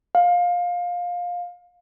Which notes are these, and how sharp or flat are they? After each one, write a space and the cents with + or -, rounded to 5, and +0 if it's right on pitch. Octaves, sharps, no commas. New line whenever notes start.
F5 +20